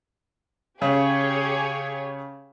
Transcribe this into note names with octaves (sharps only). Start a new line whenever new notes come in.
C#3 G4 G#4 C#5